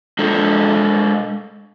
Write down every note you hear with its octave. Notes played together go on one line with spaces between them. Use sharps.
G#3 D4 A4